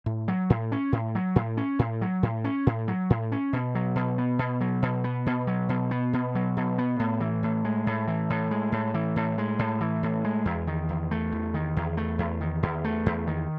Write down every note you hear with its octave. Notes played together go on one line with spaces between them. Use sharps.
A2
F#3
A2
C#4
A2
F#3
A2
C#4
A2
F#3
A2
C#4
A2
F#3
A2
C#4
B2
F#3
B2
B3
B2
F#3
B2
B3
B2
F#3
B2
B3
B2
F#3
B2
B3
A2
E3
A2
G#3
A2
E3
A2
G#3
A2
E3
A2
G#3
A2
E3
A2
G#3
E2
D#3
E2
A3
E2
D#3
E2
A3
E2
D#3
E2
A3
E2
D#3